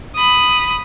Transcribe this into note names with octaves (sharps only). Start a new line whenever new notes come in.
B5 D#6